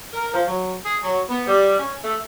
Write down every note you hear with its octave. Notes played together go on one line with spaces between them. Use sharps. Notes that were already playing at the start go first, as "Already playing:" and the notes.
A#4
F3
F#3
G#4
F#3
B3
G3
C#4
A3